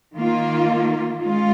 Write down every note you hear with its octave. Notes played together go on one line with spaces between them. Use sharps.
D#3 A#3 F4
G#3 C#4 F4